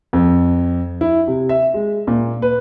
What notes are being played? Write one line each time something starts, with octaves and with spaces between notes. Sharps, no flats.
F2
E4
C3
E5
G#3
A#2
B4